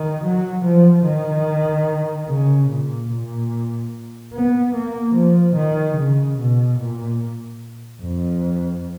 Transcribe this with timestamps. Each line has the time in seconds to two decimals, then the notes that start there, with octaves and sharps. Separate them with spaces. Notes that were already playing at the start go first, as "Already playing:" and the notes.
Already playing: D#3
0.25 F#3
0.65 F3
1.06 D#3
2.28 C#3
2.70 A#2
3.10 A#2
4.33 B3
4.74 A#3
5.15 F3
5.56 D#3
5.97 C#3
6.39 B2
6.79 A#2
8.01 F2